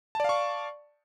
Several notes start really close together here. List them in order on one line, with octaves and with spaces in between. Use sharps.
A5 D5 F5 C#6